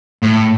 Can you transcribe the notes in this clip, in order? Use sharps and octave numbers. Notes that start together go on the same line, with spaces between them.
A2